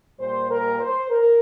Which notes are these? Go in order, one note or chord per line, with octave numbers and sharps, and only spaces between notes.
A#2 G3 C5
A#4
C5
A#4